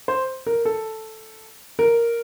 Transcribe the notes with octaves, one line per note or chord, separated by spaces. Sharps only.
C5
A#4
A4
A#4